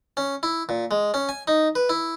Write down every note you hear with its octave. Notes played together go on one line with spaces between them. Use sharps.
C#4
E4
A#2
G#3
C#4
G#5
D#4
B4
E4